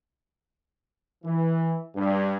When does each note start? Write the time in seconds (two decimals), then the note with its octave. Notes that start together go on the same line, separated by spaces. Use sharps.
1.25 E3
1.95 G2